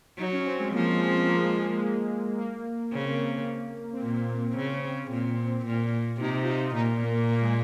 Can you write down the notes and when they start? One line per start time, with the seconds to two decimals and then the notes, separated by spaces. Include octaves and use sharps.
0.18 F#3 D#4
0.32 C#4
0.46 C4
0.59 G#3
0.73 F3 A#3
1.28 A#3
1.36 G#3
1.43 A#3
1.56 G#3
1.75 G#3
1.82 A#3
2.38 A#3
2.93 C#3 C4
3.46 A#3
3.93 C4
4.02 A#2 A#3
4.49 A#3
4.56 C#3 C4
5.11 A#2
5.66 A#2
6.20 C3 D#4
6.43 F4
6.49 D#4
6.75 A#2 D#4
7.03 A#3
7.31 A#3
7.41 G#3